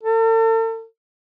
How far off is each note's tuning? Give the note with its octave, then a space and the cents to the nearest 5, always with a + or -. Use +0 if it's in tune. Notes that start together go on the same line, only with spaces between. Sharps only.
A4 +40